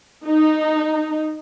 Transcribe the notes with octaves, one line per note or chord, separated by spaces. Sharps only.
D#4